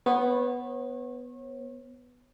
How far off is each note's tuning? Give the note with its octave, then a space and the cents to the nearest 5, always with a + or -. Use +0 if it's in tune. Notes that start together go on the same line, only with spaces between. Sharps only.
B3 +0 C#5 -35